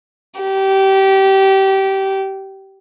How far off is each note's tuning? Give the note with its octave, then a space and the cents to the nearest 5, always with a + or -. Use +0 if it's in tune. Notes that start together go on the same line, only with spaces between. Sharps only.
G4 -20